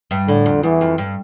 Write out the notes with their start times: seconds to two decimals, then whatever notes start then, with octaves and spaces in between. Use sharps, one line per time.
0.11 G2
0.28 A2 D3
0.46 F2
0.63 E2 E3
0.81 F2
0.98 G2